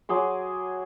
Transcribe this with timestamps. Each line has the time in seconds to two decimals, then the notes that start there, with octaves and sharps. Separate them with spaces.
0.09 F#3 G#4 C6 D6